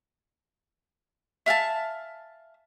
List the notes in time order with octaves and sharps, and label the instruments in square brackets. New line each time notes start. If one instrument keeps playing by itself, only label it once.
[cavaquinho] E5 F5 G#5 A5